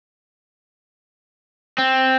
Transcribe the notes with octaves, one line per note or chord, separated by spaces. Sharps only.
C4